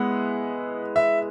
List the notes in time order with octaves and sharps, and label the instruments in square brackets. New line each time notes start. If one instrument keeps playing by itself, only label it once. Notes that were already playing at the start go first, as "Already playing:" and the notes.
Already playing: [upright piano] G#3 B3 E4 [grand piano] F#5
[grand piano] E5